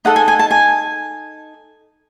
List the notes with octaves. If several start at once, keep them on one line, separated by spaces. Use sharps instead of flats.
D#4 A4 D#5 F#5
G#5
G#5
A5
G#5